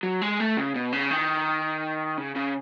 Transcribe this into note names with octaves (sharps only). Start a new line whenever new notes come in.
F#3
G#3
A3
C#3
B2
C#3
D#3
C#3
C#3